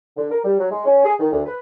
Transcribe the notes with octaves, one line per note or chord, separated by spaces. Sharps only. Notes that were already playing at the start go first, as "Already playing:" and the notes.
D3
A#4
G3
F#3
G#3
C#4
G#4
D#3
D2
B4